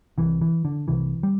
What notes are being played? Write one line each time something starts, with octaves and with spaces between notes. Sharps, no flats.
C2 C3 E3
E3
D3
C2 C3 E3
G3